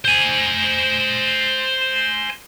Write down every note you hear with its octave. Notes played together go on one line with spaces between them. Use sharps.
C5 G#5